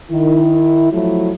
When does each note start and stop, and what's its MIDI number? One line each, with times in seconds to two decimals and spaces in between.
0.11 0.88 51
0.11 0.88 64
0.91 1.31 53
0.91 1.31 54
0.91 1.31 57
0.91 1.31 64